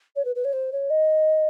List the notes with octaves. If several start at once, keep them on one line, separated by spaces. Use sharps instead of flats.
C#5
B4
B4
C#5
C5
C#5
D#5